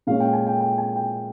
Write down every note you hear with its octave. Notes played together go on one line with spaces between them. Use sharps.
A#2 G#3 C#4 F5
G5
G#5
G5
G5
G#5
G5